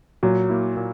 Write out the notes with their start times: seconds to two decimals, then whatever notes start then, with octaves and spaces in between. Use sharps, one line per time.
0.23 A#2 F#3
0.49 A#3 E4
0.77 A#2